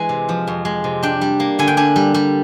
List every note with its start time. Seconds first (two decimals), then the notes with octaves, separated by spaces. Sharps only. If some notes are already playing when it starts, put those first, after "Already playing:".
Already playing: E3 G#3 G#5
0.09 C3
0.29 F3
0.47 F2
0.65 G#3
0.84 C3
1.03 D4 G5
1.21 G3
1.40 A#3
1.59 D3 G#5
1.67 G5
1.77 D4 G#5
1.96 G3
2.14 G3